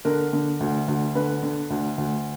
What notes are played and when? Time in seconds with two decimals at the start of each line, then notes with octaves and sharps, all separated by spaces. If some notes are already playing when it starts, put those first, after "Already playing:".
0.05 D3 A#4
0.33 D3
0.61 D2
0.88 D2
1.15 D3 B4
1.43 D3
1.70 D2
1.98 D2